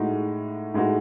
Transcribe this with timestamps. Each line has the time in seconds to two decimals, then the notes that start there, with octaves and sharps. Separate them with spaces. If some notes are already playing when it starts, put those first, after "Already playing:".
Already playing: A2 G#3 D#4 F#4
0.74 A2 G#3 D#4 F#4